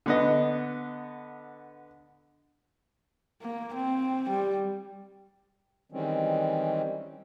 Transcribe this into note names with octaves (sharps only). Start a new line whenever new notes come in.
D3 B3 D#5
A#3
C4
G3
D#3 E3 G3 G#3 C4 C#4